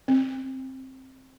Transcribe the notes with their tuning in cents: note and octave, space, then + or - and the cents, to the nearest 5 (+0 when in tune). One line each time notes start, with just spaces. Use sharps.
C4 +10